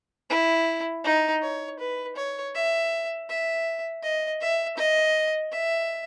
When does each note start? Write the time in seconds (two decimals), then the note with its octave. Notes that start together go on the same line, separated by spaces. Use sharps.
0.30 E4
1.04 D#4
1.42 C#5
1.79 B4
2.16 C#5
2.54 E5
3.29 E5
4.02 D#5
4.41 E5
4.77 D#5
5.52 E5